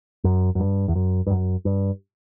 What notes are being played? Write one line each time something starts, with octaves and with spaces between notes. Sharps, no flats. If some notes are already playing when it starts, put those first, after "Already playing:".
F#2
F#2
G2
E2
F#2
G2
F#2
G2